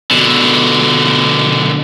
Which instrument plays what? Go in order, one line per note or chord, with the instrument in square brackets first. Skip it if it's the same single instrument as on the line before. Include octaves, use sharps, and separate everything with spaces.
[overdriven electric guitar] B2 D3